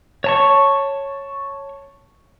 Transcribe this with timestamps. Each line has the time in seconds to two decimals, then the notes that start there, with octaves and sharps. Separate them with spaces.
0.24 C#5 A5 C#6